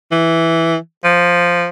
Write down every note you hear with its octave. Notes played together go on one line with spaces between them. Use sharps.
E3
F3